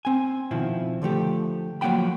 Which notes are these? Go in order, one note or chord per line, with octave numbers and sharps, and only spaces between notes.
C4 G#5
B2 D#3 F3 C4 E4
D3 F3 A3 G4
F3 F#3 A#3 F#5 G5 B5